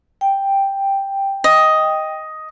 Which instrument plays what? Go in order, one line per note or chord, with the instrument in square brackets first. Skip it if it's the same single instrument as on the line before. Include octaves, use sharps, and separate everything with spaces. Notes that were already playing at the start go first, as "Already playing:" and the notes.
[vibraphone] G5
[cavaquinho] D#5